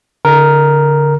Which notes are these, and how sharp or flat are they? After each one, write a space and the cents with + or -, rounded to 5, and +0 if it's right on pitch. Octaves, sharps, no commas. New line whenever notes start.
D3 -30 A#4 +0